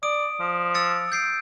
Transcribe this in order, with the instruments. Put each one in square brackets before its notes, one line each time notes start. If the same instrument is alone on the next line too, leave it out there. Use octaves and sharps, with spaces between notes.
[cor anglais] D5 [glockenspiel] D#6 D7
[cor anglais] F3
[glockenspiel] E6 A6 C#7
G6 C7 D7